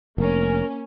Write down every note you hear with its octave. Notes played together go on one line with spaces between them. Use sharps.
F1 A#3 C#4 A#4